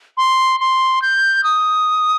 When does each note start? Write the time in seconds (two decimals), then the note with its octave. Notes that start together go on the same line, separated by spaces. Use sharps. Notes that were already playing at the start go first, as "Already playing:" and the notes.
0.17 C6
0.60 C6
1.02 G6
1.44 D#6